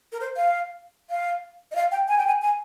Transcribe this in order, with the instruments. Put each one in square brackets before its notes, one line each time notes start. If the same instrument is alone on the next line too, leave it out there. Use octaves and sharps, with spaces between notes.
[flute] A#4
C5
F5
F5
D#5
F5
G5
G#5
G5
G#5
G#5